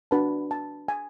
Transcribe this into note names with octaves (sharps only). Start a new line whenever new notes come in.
D4 F#4 B4 A5
A5
G#5